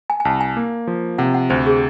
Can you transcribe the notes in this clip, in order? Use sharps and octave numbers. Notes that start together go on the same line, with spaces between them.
G#5
G#5
C2 A5
G#5
A#3
F3
C3 F#5
F#5
D2 C5
G#4